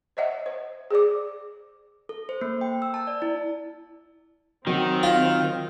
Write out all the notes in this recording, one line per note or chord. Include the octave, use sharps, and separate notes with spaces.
C5 C#5 D#5 E5 F#5
C5
G#4 C5 D5 D6
A4
C5
A#3
G5
E6
A5
D5
E4
D#3 F#3 C4
F4